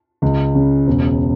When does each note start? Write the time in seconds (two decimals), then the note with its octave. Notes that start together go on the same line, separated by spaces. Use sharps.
0.22 C#2
0.55 C#3
0.87 E1